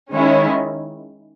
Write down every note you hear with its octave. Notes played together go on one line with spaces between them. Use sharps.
D#3 G#3 C#4 E4